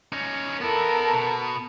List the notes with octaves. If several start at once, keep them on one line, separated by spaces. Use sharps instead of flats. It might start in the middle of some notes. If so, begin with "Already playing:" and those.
C#4 D#4
B3 E4 A4 A#4
B2